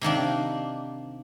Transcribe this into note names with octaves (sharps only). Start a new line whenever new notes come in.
C3 D#3 A#3 D4